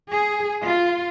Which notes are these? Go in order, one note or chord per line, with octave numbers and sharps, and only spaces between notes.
G#4
F4